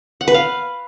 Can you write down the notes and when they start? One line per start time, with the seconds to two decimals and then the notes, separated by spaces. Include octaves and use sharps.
0.21 F#5
0.28 B4
0.34 F5